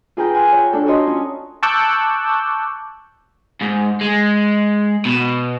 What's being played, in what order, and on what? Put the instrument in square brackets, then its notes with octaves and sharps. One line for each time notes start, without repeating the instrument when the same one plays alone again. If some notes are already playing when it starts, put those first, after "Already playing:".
[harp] F4 G#4 A#4 B4 G5 A#5
F#5 G#5 C6 F6 F#6
C#5 G5
D4 A4
F#4 A4 A#4 C#5 D#5 C6
C#4 F4
[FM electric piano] A5 C#6 D6 E6 F#6 G6
[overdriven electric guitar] G#2
G#3
B2